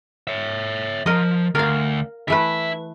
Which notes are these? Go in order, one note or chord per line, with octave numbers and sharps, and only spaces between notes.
C#5 E5
F3 A#4 D#5
D2 A#4 F5
E3 A3 E4 B4 E5